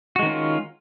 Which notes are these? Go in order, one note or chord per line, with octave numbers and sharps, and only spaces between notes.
D#3 G#3 C#4 F4 F#4